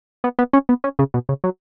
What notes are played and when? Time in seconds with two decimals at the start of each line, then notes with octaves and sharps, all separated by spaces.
0.24 B3
0.39 B3
0.53 C#4
0.69 B3
0.84 C#4
0.99 C#3
1.14 B2
1.29 C#3
1.44 F#3